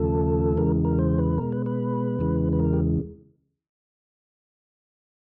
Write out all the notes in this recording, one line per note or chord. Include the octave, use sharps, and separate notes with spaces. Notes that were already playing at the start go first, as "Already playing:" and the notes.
Already playing: D#2 C#3 F3 A3 A4
E2 C#3 E3 G#3 A#4
A#4
C5
B4
B2 G#3 A#4
B4
B4
E2 C#3 E3 G#3
B4
A#4
G4